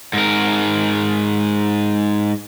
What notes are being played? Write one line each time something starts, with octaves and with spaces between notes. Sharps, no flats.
G#2 A#4